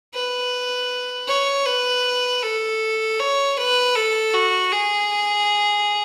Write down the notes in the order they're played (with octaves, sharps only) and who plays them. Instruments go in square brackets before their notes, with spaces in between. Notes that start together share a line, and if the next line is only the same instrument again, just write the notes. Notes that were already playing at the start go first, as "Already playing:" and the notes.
[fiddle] B4
C#5
B4
A4
C#5
B4
A4
F#4
G#4